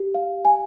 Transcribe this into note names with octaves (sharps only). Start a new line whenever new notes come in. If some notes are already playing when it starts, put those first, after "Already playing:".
Already playing: G4
F5
G#5